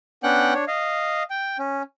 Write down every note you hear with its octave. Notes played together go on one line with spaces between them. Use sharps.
B3 C#4 D4 F#5 G5 F#6
D4 C#5
D#5 F5
G5
C#4